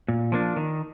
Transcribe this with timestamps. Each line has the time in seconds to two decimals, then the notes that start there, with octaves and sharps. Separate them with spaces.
0.08 A#2
0.32 F3 A#3 D4
0.56 D#3